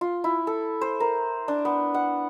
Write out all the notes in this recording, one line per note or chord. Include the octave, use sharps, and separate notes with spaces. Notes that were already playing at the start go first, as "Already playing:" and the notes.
F4
E4
A4
C5
A#4
D4
B3
F#5